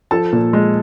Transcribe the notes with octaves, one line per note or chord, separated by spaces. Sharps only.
F3 A4 A5
A#2
G#3